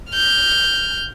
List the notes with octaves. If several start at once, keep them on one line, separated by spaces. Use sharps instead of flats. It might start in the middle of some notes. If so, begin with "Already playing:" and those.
F6 G6